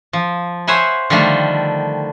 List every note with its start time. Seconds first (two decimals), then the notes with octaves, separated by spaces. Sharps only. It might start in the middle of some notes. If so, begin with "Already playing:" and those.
0.13 F3
0.67 C5 C#5 E5 F#5 G#5 B5
1.10 D3 D#3 F3 G3 A3